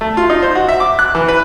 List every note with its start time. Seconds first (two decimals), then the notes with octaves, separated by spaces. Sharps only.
0.01 A3
0.17 F4
0.30 D#4
0.42 C5
0.55 F#4
0.69 E5
0.80 D6
0.99 F#6
1.15 E3
1.28 B4